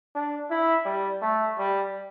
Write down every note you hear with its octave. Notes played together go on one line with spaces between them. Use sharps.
D4
E4
G3
A3
G3